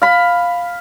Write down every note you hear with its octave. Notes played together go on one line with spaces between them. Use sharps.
F5 B5